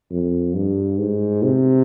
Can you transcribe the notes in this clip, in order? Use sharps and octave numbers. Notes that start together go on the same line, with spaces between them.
F2
G2
G#2
C3